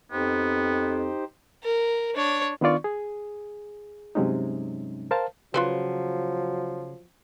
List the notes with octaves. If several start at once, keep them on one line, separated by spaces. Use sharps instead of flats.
F2 B3 D#4 G4 C5
A#4
D4 C#5
D#3 B3 D4 F4 D5 C#6
G#4
G2 C3 F#3 G#3 C#4 D#4
A#4 C5 F5 A5
C#3 F3 F#3 F4 B4 C5